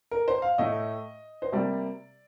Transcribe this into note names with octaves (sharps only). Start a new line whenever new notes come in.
A#4
C5
F5
A2 A3 D#5
C5
C3 G3 A#3 D5